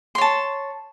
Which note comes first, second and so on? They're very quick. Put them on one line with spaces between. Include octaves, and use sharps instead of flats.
C6 C#5 A5